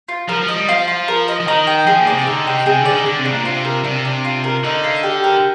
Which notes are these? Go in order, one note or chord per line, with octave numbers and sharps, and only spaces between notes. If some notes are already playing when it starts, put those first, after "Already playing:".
F4
F3 A#4
F3
D#5
G3
F3 F4
F4
A#4
D#5
F3
D#3 D#4
G5
F3 G#4
A#2
D5
C3
D3 D#4
C3 G5
C3 G#4
D3
D5
D#3
D3 D4
C3
D4
A#2
C3 F4
A#4
C3 D4
D4
F4
A#4
D3 D#4
F5
G4
A#4